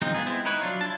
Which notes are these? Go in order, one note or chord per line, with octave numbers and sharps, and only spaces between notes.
F3 G#3 C4 D#4
B3 F4 G#4
G#3 B3 C4 E4
D#4 E4 B4 C#5
F#3 D4 F4
E4 F4 A5